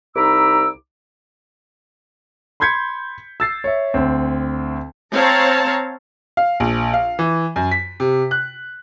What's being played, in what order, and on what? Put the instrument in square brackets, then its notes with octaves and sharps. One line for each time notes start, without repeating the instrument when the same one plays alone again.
[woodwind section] C2 D#4 A#5 B5 D6 E6
[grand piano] B5 C6 G6 G#6 B6 C#7
E6 A6 C7
C#5 E5
D2 C4
[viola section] C4 C#5 F5 A5 A#5
[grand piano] F5
A#1
F5
E3
F#2
B6
C3
F#6